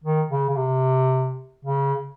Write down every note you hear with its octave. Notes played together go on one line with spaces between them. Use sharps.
D#3
C#3
C#3
C3
C#3